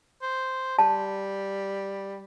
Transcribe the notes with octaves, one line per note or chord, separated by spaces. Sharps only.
C5
G3 A5